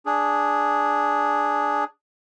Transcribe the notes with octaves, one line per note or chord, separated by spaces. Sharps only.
D4 G#4